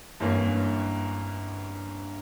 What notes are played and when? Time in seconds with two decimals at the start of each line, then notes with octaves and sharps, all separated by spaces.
0.20 G1 G2 E3 A#3 C#4